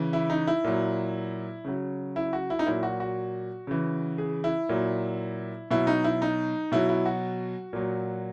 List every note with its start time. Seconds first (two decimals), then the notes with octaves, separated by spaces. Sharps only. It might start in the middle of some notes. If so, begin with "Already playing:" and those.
Already playing: C#3 E3
0.13 E4
0.30 D#4
0.47 E4
0.64 A#2 F#3
1.65 C#3 F#3
2.16 E4
2.33 F#4
2.50 E4
2.59 D#4
2.66 A#2 F#3 E4
2.83 F#4
3.00 F#4
3.67 C#3 E3
4.18 G#4
4.44 E4
4.69 A#2 F#3
5.71 B2 F#3 E4
5.87 D#4
6.04 E4
6.22 D#4
6.72 B2 F#3 E4
6.89 E4
7.06 F#4
7.73 A#2 F#3